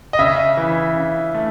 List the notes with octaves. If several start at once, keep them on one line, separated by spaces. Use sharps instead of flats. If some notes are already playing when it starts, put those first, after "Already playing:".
D#5
C#3 E5
E3
C#3
A3